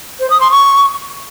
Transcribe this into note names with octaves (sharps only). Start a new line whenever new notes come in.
C5
D#6
C6
C#6